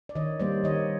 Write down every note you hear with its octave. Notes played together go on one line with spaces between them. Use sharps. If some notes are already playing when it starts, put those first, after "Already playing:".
D5
D#3 C#5 D#5
G3 A#3 C5 D5
D#3 C#5 D#5